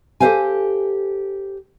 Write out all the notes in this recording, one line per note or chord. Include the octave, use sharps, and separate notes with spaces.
G4 A4 A#4 C5 F5 G#5